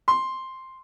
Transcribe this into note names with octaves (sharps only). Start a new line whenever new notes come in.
C6